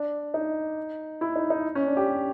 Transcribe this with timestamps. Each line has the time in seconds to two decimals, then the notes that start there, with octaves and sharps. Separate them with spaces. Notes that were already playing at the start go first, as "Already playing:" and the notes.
Already playing: D4
0.34 D#4
1.21 E4
1.36 D#4
1.50 D#4
1.75 C#4
1.87 D4
1.97 G4